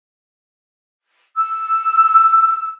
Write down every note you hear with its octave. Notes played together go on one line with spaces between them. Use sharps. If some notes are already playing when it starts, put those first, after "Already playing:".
E6